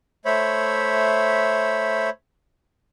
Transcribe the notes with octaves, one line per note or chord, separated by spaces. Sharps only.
A3 C5 C#5 E5 B5